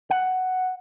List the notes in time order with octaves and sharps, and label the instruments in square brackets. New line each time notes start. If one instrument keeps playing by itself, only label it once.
[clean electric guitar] F#5